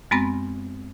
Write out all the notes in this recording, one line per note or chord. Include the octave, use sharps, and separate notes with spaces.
F#2 G#3 B3 C4 B5 A#6